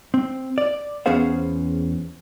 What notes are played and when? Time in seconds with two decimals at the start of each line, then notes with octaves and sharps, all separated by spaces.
0.14 C4
0.58 D5
1.06 E2 B3 C#4 G#4 C5 F5